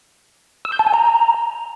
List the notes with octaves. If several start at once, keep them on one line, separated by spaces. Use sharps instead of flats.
E6
G6
A5
G#5
A#5